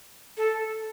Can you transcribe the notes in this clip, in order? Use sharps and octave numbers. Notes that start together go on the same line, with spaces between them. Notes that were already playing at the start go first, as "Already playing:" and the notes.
A4